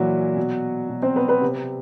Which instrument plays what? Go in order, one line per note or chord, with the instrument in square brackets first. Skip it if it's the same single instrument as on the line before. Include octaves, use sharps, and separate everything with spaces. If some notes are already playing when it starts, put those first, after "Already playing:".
Already playing: [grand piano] A#2 E3 F#3 E4 F#4
B2
B2
C4 C5
B3 B4
B3 B4
C3